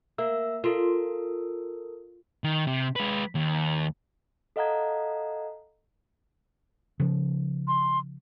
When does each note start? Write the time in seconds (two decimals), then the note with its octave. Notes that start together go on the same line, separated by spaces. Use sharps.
0.18 A#3 A#4 E5 E6
0.64 F4 A4 A#4
2.44 D#3
2.67 C3
2.96 G#3 B4
3.35 D#2
4.56 A4 D#5 F5 F#5 A#5 G#6
7.00 C#3 F3
7.68 C6